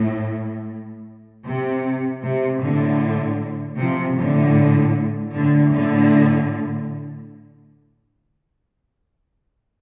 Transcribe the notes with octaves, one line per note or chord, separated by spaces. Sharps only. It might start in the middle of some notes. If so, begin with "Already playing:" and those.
Already playing: A2
C3
C3
A2 D3
C3 F3
A2 D3
A2 D3
A2 D3